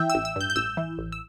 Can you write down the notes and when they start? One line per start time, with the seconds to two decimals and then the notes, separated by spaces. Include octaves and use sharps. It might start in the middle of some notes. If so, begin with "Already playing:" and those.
Already playing: E3 E5 G5
0.10 E6
0.15 A1
0.25 E6
0.36 G2 G6
0.50 G6
0.56 A1 E6
0.77 E3
0.98 A1
1.12 E6